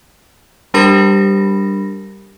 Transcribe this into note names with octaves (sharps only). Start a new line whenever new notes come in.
G3 D4 G4 A#4 B5 A#6